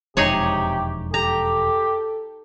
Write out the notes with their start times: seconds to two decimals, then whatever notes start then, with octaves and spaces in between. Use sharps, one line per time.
0.17 E1 F2 C3 G#3 D#4 G4 G#4 C#5
1.14 G4 A4 A#5